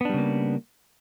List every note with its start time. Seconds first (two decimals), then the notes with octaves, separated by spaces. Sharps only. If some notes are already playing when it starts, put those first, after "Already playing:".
0.01 B3
0.05 D4
0.09 G3
0.14 C#3
0.18 A#3